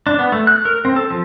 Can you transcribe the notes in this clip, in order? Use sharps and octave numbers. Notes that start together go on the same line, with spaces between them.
D4
B3
A3
F#6
A#4
C4
A4
F3